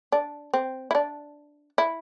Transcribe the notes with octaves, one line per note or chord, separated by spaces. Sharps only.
D4
C4
E4
D4
E4